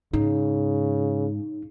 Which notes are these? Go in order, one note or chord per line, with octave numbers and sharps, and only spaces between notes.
G#2 C#3 D#4